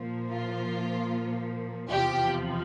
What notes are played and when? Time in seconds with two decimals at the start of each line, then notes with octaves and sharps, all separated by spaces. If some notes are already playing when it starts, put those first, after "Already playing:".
Already playing: A#2 F3 A#3
0.30 F4
1.89 E2 C3 F3 G4